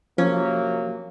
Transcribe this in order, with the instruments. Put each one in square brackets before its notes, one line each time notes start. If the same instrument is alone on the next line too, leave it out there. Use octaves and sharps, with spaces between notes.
[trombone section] C3 F#3 A#3 [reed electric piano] F3 [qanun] C#4